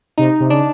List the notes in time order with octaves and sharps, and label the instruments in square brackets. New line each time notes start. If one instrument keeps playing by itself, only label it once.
[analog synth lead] C3 [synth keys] D#4
[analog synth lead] C3
[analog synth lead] C#3 [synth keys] D4